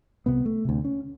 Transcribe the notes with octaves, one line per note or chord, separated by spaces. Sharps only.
C2 C3 B3
A3
D2 C3
C#4